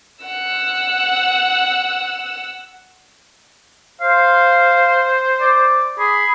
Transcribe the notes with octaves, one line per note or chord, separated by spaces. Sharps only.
F#5 E6
C5 F5
D5
G#4 B5